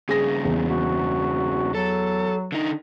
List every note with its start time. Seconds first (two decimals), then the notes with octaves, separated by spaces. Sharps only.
0.09 G2 C#3 G#4 A#6
0.45 E2
0.66 F#4
1.74 F#3 A4
2.52 D3 D#4